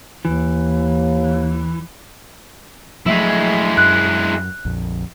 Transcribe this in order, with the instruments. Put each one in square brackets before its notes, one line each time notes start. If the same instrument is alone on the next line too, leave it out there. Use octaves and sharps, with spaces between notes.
[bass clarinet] D#2 [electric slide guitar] E3
[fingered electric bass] F3 F#3 A3 [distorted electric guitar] G#3 E4
[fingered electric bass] F#2 [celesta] F#6
[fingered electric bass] A#1 F2